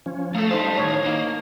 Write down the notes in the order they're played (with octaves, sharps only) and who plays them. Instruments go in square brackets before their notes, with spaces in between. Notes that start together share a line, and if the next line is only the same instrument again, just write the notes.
[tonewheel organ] F3 C#4
[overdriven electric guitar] A3 A4 [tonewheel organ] F5 A#5 D#6
[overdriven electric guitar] G3 A5 [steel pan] D#4 C5
[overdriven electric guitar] A2 D#3 [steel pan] C#5
[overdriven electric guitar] A#3 [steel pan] D#4